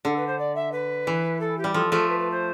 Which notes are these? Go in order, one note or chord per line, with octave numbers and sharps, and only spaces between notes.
D3 A4
B4
C5
D5
E5
B4
E3
A4
G4
G3
F3 A4
F3 A3
B4
B4
C5